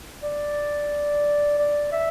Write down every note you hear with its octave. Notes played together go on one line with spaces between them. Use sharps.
D5
D5
E5